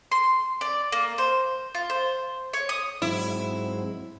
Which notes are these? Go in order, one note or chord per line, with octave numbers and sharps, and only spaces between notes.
C6
D5
A#3
C5
F4
C5
C#5
D#6
G#2 F#3 C4 E4